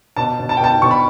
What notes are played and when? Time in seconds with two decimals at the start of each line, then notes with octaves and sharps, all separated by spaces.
0.17 B2 A5
0.39 B2
0.49 A5
0.57 G5
0.60 B2 A5
0.82 B2 C#6
0.91 B5